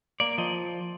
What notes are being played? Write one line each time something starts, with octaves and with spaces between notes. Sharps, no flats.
A#3 D5
F3 D#5